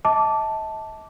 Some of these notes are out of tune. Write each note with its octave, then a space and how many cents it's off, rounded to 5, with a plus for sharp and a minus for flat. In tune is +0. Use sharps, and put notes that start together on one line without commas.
D#5 +45 A5 +0 D6 -10